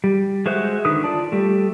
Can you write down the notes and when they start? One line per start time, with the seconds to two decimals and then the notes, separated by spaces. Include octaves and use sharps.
0.04 G3
0.46 G#3 F#4 C5 E5 F#6
0.85 D3 D#3 B4 D#6
1.04 F4 D5 A5
1.32 G3 A3